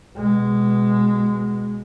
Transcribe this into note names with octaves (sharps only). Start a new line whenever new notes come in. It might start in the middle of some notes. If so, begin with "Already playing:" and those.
B2 G#3